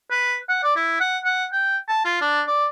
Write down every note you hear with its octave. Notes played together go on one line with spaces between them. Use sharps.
B4
F#5
D5
E4
F#5
F#5
G5
A5
F4
D4
D5